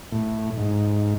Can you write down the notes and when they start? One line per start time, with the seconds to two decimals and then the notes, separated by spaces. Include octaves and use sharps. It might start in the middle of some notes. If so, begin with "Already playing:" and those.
0.12 A2
0.57 G#2